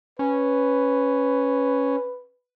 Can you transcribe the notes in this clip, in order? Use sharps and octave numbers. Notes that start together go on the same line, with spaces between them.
C#4 B4